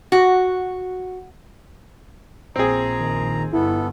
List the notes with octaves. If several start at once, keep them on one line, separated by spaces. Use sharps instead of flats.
F#4
A#1 C4 G#4 A#5
D#3
G1 B3 E4 A4